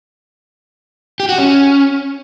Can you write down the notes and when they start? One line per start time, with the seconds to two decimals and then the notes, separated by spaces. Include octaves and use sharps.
1.20 G4
1.29 F#4
1.38 C#4